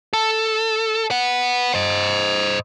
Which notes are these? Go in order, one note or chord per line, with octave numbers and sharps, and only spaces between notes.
A4
B4 F#5
C5 D#5